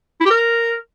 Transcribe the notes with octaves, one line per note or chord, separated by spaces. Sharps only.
E4
G4
A#4